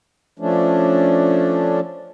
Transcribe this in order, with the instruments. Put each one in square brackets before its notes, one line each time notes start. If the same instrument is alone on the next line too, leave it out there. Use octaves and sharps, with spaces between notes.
[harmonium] F3 A3 C#4 D4